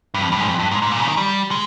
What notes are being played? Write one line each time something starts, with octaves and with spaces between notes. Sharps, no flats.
G2
F2
G2
G#2
F2
G2
G#2
G#2
A#2
C#3
D#3
G3
G#3